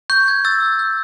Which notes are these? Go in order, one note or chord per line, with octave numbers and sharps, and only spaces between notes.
C#6 G6
G#6
E6 A6
G6